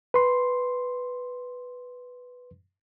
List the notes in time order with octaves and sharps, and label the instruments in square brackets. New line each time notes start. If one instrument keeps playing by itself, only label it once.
[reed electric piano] B4 C6